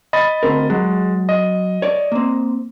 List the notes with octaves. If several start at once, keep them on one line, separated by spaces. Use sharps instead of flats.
D#5 B5 A6
D2 C4 A#4
F#3 G#3
D#5
C#5 D5
A#3 C4